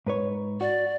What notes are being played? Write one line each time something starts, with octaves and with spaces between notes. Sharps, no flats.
G#2 B4 C#5
F#4 D5